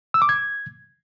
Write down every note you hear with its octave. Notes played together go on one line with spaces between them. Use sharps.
E6
D6
G#6